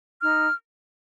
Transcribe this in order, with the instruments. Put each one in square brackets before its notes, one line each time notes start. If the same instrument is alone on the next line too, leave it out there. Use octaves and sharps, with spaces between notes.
[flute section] D#4 F6